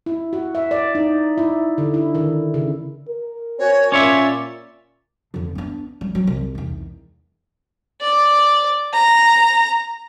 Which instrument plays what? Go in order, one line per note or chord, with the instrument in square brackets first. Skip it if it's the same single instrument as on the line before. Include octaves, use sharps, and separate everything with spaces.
[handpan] E4
F#4
E5
D5
D#4
E4
D3
E4
D#3
C#3
[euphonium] A#4
[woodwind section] C4 F#4 G#5 [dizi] C#5
[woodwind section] A#2 D5 [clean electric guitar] C#4 C#5 E5 [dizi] C6
[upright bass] F2 D3
B3 D4
G3
F#3
C2
E2 D#3
[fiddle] D5
A#5